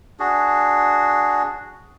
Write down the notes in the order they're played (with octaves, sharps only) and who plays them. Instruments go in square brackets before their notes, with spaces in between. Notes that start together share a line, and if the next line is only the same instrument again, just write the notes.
[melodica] D4 F#4 G#4